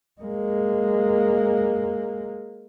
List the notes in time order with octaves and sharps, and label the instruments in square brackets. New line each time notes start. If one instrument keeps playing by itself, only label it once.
[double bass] G#3 A#3